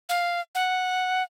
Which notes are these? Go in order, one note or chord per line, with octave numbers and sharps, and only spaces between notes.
F5
F#5